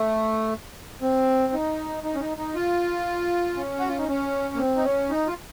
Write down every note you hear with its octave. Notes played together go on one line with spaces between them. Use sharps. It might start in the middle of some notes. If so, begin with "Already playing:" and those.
Already playing: A3
C4
D#4
D#4
C#4
D#4
D#4
F4
C#4
F#4
F4
D#4
C#4
A#3
C4
D#4
C#4
D#4
F4